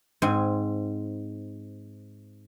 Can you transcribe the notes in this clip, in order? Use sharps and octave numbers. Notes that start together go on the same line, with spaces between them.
G#2 C4 G#5